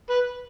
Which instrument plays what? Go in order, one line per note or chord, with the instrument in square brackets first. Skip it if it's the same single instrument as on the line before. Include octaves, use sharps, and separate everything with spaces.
[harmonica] B4